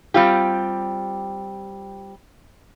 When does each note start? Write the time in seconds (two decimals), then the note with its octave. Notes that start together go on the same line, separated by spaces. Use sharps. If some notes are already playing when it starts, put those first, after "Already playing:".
0.14 G3 C4 F4 G4